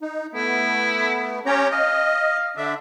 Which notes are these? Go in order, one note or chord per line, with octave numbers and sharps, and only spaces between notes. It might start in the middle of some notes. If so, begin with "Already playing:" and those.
D#4
A3 B3 E4
C#4 G4 C#5 A#5
D#5 F5
D3 D4 E5